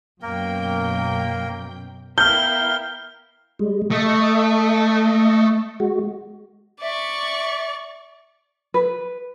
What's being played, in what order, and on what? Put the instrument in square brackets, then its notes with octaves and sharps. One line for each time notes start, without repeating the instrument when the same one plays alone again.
[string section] F#2 B2 G5 [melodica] A#3 A#4
[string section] B3 E4 A#4 [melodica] F5 G5 [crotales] F6 G7 [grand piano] G6
[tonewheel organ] G3 G#3
[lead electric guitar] A3 [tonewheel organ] D#5
[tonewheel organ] G#3 F#4
[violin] D5 C#6 [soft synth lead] E5
[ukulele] B4